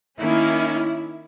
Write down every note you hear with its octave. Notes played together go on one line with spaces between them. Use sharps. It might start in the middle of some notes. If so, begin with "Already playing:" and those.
D#3 A#3 C#4 E4